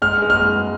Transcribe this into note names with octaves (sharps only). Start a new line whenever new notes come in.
G#3 F6
G#3
F6